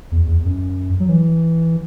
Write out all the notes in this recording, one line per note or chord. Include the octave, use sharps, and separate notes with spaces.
E2
E2
F#2
F#3
E3